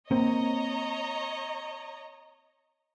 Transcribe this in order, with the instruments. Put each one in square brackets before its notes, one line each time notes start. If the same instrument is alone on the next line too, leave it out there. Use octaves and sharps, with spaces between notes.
[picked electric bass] A#3 C4 [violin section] C#5 D#5 A#5